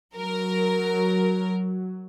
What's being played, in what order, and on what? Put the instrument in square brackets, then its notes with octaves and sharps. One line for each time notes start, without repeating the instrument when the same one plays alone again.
[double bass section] F#3 [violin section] A#4